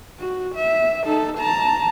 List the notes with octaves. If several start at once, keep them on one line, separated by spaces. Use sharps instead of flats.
F#4
E5
D#4 A4
A5 A#5